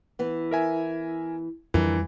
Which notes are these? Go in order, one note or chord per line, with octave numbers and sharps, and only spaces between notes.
E3 B3
A#4 E5 G#5
F2 D3 E3 G3 A#4